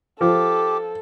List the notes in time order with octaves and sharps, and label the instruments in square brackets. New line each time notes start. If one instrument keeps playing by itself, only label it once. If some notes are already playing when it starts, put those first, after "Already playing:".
[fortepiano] F3 [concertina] G4 [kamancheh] A4